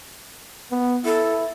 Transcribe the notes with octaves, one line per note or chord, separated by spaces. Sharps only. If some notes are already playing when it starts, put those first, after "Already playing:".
B3
E4 A4